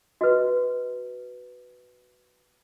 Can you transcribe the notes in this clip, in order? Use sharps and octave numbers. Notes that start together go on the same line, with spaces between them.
F#4 B4 D#5